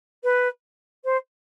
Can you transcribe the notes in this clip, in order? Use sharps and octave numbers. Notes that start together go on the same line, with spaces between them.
B4
C5